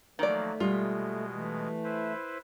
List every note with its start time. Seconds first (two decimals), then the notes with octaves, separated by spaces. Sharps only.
0.19 D#3 F3 F#3 A3 A#3 D5
0.60 B2 G3 G#3 F4
1.33 E3 A3
1.84 E4 B4 C5